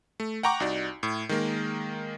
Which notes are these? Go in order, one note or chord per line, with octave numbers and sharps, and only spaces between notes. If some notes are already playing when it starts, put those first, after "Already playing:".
A3
F#5 G5 A#5 C#6 D6
C2 D#4 F#4 D5
A2
D#3 G#3 A#3